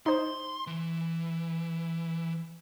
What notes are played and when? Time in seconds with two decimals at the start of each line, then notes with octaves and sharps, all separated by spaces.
0.06 D#4 C5 C6
0.67 E3